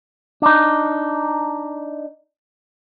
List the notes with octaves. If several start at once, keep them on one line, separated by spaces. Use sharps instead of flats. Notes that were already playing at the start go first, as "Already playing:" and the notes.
D4 D#4